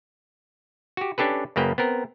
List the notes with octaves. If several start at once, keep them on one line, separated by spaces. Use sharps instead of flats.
F#4 G4
C#4 D4 G4 A4 B4
F#2 C#3 A#3 B4 G5
B3 C4 A#4